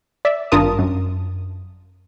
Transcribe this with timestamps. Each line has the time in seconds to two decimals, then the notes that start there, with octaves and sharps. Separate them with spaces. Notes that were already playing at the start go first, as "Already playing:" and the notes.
0.25 D5 E5
0.52 G#1 G2 F4 A#4 A5 D#6
0.79 F#2